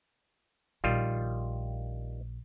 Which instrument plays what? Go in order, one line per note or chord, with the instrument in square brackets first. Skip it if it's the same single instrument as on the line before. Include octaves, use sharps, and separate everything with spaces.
[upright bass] A#1 [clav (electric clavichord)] D#3 G3 F4